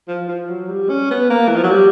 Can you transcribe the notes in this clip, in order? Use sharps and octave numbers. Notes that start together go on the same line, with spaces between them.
F3
F3
F#3
G3
C#4
B3
A#3
E3
F3
F#3
G3